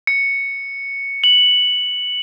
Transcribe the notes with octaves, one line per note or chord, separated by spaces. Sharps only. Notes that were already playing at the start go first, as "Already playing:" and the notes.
C#7
F#7